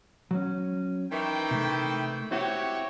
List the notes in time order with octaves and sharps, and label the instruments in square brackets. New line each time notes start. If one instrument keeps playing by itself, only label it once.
[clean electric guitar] F#3 C#4
[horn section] D#3 E3 G5
[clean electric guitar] C3 A3
[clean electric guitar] C4 E4 [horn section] F#4 G4 C#5